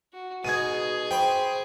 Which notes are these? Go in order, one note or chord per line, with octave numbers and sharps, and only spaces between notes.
F#4
B2 D#4 G#4 G#6 D#7
C5 G5 B5 C#6